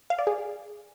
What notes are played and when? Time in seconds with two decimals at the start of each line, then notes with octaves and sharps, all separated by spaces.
0.10 F5
0.19 D5
0.27 G#4